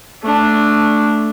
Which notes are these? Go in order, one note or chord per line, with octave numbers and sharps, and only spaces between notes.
A3 D4